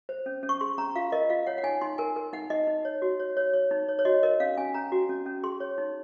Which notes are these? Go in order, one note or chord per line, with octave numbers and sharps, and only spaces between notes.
C5
C#4
C#4
C#6
G#4 C6
C#4 A#5
F4 F5
A#4 D#5
F4 F5
C#5 F#5
F#5
D#4 G#5
D#4 C6
A#4 G#5
A#4
D#4 F#5
D#4 D#5
D#4
C#5
F#4
C#5
C#5
C#5
D#4
C#5
C#5
F#4 D#5
A#4 D#5
C#4 F5
C#4 G#5
C#4 A#5
F#4
C#4
C#4
G#4 C6
C#5
D#4